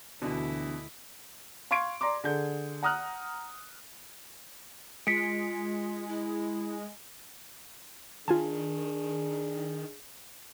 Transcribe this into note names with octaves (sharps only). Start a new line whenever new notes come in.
D2 B2 D3 E3 E4
F5 C6 C#6 G#6 D7
D5 A#5 C6 D6
D3 G#4 G6
F#5 A#5 D#6 F6 F#6
G#3 F4 B6 C#7 D7
E4
D#3 D4 F4 G#4 G#5 A5